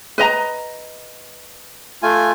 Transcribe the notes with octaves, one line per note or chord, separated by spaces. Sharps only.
B4 D#5 A#5
A3 F4 G#5